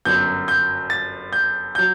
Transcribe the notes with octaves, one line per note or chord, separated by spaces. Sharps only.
G1 F#2 F#3 G6
G6
A6
G6
F#3 G6